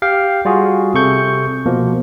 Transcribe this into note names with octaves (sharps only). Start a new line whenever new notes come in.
G4 F5 G5
G3 F4 F#4 G#4
C3 A4 C#6 G6
B2 F3 A#3